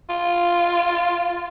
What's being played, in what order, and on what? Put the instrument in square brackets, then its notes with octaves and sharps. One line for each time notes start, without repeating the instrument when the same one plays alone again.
[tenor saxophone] F4